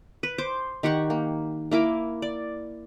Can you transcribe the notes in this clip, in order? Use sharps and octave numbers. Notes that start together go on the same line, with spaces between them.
B4
C5 D6
D#3 G4 F#5 C#6
A#3
A#3 E4 A#4 D6
D5